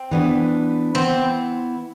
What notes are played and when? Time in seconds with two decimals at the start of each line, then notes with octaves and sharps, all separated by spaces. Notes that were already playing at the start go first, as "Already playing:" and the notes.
Already playing: C4
0.11 E3 B3 D4 G4 B4
0.95 E3 B3 C4 E4